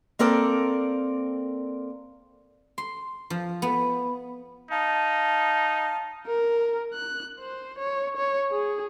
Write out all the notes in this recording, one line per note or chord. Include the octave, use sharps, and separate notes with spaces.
A#3 C4 A4 A#4 D5
C6
F3
B3
D#4 F5 A5
A#4
F#6
C5
C#5
C#5
G#4